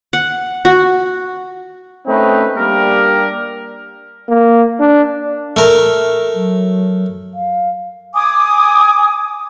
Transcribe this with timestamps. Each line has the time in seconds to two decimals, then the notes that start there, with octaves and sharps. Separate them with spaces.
0.13 F#5
0.65 F#4
2.06 A3 C4 C#4 D#4 B4
2.55 G3 A#3 D4 G4 A#4
4.28 A#3
4.80 D4
5.56 A3 A#4
6.34 F#3
7.34 F5
8.15 G#5 D6 D#6